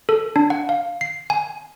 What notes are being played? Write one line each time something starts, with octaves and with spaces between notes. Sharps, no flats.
A4
D4
F#5
F5
C7
G#5